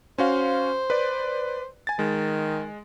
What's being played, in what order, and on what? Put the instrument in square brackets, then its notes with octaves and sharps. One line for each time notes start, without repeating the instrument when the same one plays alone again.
[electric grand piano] C#4 F#4 F5 [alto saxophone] C5
[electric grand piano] B4 D5
G#5 A6
[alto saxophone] D#3 [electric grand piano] G#3